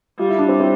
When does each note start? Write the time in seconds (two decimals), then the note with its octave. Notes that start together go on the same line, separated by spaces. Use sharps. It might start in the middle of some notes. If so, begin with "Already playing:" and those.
0.19 G3 F4
0.29 E4
0.39 D4
0.49 C4 E4
0.59 C4 E4